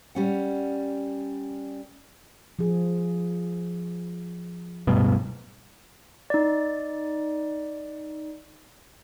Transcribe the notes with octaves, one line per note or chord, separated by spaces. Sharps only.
G3 C#4 F#5
F3 G#4
D1 G2 B2
D#4 D5